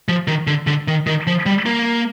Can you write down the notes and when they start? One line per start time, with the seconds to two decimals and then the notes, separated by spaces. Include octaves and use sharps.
0.08 F3
0.28 D#3
0.47 D3
0.67 D3
0.88 D#3
1.07 D#3
1.27 F3
1.46 G3
1.66 A#3